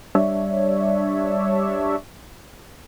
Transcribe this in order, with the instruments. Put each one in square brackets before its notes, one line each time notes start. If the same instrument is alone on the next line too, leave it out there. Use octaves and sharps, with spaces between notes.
[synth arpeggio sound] G3 D4 C#5 D5 E5